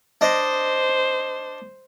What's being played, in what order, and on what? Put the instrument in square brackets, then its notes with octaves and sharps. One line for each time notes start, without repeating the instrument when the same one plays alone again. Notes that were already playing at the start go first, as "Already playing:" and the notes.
[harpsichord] D4 D#5 [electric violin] C5